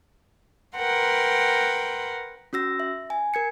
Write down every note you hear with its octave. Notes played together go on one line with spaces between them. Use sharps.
A#4 B4 F#5 G5 C6
C#4 F#4 E6 A#6
E5
G#5
A#4 G#6 C#7